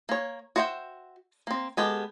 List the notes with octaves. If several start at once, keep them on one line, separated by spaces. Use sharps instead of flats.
A#3 C#5
F#4 C5 E5 F5 G5
A#3 C4
G#3 B3 G4 A4